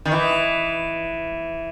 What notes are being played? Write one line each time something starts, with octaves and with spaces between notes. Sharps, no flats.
D#3
E3